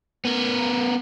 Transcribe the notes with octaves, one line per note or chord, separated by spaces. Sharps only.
B3 A#4